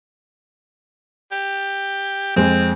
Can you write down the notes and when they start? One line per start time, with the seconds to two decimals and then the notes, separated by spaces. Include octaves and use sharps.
1.32 G4
2.36 F2 G#3 C4